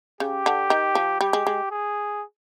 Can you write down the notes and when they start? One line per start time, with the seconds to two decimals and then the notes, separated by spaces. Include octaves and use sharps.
0.20 C#3 G4
0.46 D3
0.70 D#3
0.95 F3
1.21 G3 G4
1.33 G#3
1.47 G#3
1.71 G#4